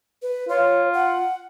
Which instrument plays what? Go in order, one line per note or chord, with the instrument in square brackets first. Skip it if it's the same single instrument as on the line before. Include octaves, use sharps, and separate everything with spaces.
[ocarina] B4
[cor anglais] F4 [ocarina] C#5
[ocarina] F#5